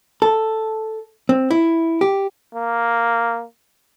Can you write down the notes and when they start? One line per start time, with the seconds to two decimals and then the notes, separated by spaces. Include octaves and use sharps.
0.22 A4
1.29 C4
1.51 E4
2.01 G4
2.55 A#3